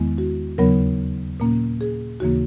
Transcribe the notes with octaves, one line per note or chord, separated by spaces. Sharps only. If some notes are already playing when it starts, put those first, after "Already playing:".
Already playing: E2 D#3 G#3 B3
F#4
D#2 C#3 F#3 B3 A#4
A#2 A#3 C#4
G#4
D#2 C#3 E3 A#3 F#4